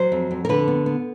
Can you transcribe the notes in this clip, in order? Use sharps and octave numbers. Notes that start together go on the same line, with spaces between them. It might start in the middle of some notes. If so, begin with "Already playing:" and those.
Already playing: F#3 C5
F2
F2
A#4
D3 B4
B3
B3